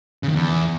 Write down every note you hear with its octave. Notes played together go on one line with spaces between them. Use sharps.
C#3
D#3
E2